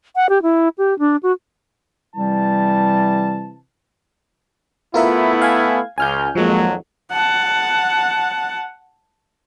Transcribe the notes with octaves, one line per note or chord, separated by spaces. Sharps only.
F#5
G4
E4
G4
D4
F#4
C3 E3 G3 A5
A3 B3 E4 F4 A#4 E5
F5 G#5 G#6
C#2 G#5 F6 G6
G#1 F2 F3 F#3 G#3 A#3
F#5 A5